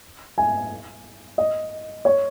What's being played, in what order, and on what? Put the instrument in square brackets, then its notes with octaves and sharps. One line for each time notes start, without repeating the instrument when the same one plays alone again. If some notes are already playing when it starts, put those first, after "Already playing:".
[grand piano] G#5
D#5
C#5